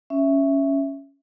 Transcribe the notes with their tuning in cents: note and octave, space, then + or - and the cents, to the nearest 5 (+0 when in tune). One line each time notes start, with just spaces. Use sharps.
C#4 +0 E5 +0